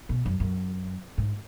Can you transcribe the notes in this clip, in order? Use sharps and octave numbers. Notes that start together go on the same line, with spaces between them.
B2
F#2
F#2
G#2